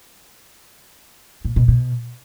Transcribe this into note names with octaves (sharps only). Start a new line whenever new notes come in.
A#2
B2
B2